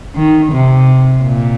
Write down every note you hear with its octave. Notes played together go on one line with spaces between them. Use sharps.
D#3
C3
A#2